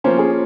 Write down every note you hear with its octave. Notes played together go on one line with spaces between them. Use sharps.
F3 A#3 C#4 C5
G#4